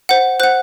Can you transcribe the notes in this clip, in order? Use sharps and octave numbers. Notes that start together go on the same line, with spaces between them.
C5 F#5
C5 F#5 F#6